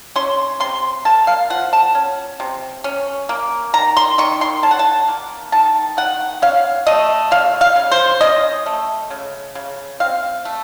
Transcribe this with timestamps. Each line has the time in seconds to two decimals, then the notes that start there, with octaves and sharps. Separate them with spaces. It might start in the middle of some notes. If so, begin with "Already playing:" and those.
0.16 C#4 C6
0.60 C3 C6
1.05 A#3 A5
1.27 F5
1.50 F3 F#5
1.73 A5
1.95 C#4
2.40 C3
2.84 C#4
3.29 A#3
3.74 D#3 A#5
3.97 C6
4.18 D#3 C#6
4.41 C6
4.63 C#4 A5
4.71 F#5
4.79 A5
5.08 A#3
5.52 D#3 A5
5.97 D#3 F#5
6.42 C#4 F5
6.87 A3 D#5
7.31 C#3 F5
7.61 F5
7.76 C#3
7.91 C5
8.21 C#4 D#5
8.66 A3
9.10 C#3
9.55 C#3
10.00 C4 F5
10.45 A3